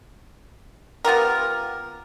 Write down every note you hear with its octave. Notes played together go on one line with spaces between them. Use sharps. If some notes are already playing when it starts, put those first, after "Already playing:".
B3 F4 G4 A#4